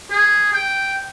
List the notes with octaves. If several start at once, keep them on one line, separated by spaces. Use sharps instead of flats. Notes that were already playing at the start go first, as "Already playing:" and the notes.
G#4
G5